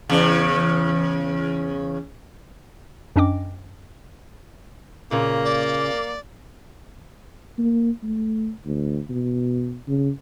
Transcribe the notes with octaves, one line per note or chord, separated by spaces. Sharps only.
E2 C#3
F#2 C#4 D4 D#5 G5 D6
A#2 C#3 A#3
D5
A#3
A3
D2
B2
C#3